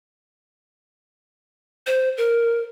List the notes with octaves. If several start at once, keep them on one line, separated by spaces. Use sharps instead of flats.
C5
A#4